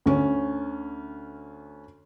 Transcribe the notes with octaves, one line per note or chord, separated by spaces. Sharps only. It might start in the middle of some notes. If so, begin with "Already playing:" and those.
D2 C#4